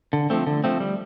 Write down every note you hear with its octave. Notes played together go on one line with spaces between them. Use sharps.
D3
F3 A3 C4
D3
F3 A3 C4
G3